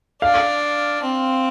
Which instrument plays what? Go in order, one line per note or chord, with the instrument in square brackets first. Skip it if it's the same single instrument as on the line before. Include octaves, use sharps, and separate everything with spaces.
[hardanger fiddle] D4 [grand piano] F5
[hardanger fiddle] C4